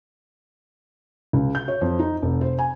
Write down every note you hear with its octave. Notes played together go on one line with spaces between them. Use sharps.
C#2
G6
C#5
F2
D#4
F1
C5
G#5